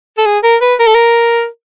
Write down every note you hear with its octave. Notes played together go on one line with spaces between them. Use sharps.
A4
G#4
A#4
B4
A#4
A4
A#4